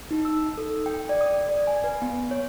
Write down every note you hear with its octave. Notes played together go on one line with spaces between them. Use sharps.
D#4
E6
A4
G5
D5
D#6
D5
G#5
B4
B3
C#5